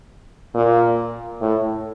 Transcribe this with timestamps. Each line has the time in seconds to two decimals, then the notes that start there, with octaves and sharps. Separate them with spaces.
0.55 A#2
1.41 A2